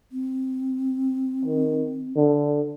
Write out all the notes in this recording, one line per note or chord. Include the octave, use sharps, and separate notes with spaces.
C4
D#3
D3